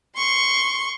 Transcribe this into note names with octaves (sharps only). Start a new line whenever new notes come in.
C6 C#6